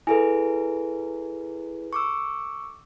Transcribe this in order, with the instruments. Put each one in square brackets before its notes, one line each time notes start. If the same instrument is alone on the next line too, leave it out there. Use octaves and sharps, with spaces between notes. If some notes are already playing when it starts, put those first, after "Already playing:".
[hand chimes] E4 G#4 B4 [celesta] A4 G#5
[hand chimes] C#6 D6 E6